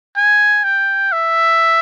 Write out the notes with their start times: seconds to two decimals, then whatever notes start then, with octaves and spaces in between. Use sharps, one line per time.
0.17 G#5
0.64 G5
1.12 E5